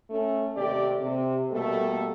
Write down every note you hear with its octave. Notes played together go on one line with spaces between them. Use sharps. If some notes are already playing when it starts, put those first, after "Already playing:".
A3 C#4 A4
D#2 C3 A3 G4 D5
C3
B2 G3 A3 A#3 A4